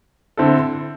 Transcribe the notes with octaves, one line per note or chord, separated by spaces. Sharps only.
D3 C4 E4 A4